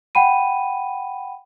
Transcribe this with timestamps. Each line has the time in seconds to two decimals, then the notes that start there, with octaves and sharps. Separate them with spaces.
0.15 F#5 G5 B5 D#7